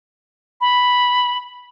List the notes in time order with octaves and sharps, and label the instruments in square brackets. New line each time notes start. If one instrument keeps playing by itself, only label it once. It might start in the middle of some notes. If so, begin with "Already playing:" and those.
[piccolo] B5